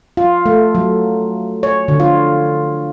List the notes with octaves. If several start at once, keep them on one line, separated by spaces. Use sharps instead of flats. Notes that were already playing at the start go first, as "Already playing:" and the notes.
F4
A3
F#3
C#5
D3
F4